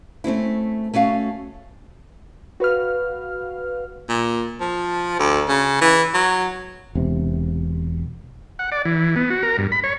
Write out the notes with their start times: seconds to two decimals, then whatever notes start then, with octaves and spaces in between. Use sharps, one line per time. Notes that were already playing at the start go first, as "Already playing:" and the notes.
0.24 A3 C4 C#4 E4
0.94 A3 C#4 F#4 F5
2.60 F#4 B4 F5 F6
4.09 A#2
4.60 F3
5.19 D2
5.48 C#3
5.81 E3
6.14 F#3
6.95 E1 C3
8.59 F#5
8.72 D5
8.85 E3
9.16 B3
9.30 F#4
9.43 A#4
9.58 G2
9.72 B5
9.84 C#5